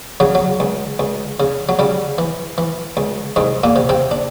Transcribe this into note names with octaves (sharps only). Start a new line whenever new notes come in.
C#3 F#3
F#3
C#2
C#2
C#3
F#3
C#3 G3
E3
E3
C#2
C2 G#2 G#3
A#2 A#3
C3
C3 C4
D4